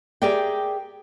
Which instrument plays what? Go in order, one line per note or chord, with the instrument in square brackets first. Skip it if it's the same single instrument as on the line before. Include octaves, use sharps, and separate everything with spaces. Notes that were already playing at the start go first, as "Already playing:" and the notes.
[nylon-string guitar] G4 G#4 A#4 D5 E5 G5